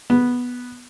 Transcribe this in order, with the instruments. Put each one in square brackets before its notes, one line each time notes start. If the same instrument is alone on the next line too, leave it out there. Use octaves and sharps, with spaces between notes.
[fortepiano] B3